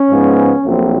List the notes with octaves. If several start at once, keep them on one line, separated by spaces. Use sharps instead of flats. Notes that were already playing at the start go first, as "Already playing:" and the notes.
Already playing: C#4
G#2 F3 G#3 B3
A#1 A#2 F#3 A3 C4